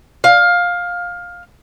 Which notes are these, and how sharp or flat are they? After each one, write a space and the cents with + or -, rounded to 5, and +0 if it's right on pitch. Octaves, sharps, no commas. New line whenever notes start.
F5 +15